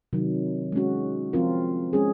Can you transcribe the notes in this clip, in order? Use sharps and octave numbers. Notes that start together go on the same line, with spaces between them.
C3 D#3 F#3
G#3 C#4 F#4
F3 C4 F4 A#4
G#3 C#4 G#4